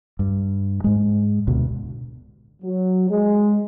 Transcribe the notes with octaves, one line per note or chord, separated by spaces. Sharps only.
G2
G#2 G#3
D2 B2
F#3
G#3